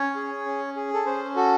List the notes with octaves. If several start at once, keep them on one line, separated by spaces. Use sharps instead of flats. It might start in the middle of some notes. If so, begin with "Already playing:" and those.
Already playing: C#4 C#5
G#4
C#4
G#4
A4
C#4 C5
F#4 A4